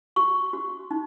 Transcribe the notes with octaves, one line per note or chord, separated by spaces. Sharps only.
F#4 C#6
F#4
D#4